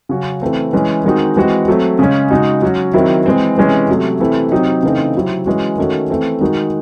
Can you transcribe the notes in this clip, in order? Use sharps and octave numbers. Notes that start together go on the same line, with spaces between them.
C#3 F#3 C#4 F#4
E3 A3 C4
E3 G#3 C#4
D#3 G#3 C4 D#4 F#4
E3 G#3 C4 F#4
F#3 A3 C4
C#3 G#3 C#4
C#3 G#3 D#4 F#4
F#3 C#4 F#4
D#3 F#3 C4 E4
E3 G#3 C4
C3 E3 G#3 C#4
C3 F#3 A3
C3 E3 A3 C4 E4
C3 F#3 C4 D#4
C#3 E3 A3 C4 D#4
C3 F#3 C4 E4
E3 G#3 C#4 F#4
D#3 A3 C#4 F#4
E3 A3 C4
D#3 G#3 D#4 F#4